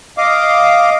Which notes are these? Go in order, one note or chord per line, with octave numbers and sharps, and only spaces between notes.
D#5 F5 D6